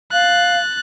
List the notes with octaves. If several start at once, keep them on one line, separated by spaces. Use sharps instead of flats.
F5 F#6 A6